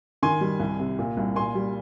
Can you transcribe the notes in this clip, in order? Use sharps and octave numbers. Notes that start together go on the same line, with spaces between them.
D#3 G#5 C6
G3
C2
C3
A#2
C2
A#2 G#5 C6
G3